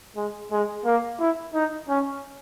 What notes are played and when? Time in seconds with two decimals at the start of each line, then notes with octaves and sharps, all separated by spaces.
0.16 G#3
0.52 G#3
0.85 A#3
1.20 E4
1.54 D#4
1.89 C#4